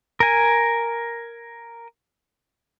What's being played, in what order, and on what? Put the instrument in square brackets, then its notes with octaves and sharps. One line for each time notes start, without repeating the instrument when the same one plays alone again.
[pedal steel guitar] A#4 G#5